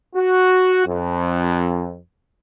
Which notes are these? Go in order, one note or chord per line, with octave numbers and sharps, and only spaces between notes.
F#4
F2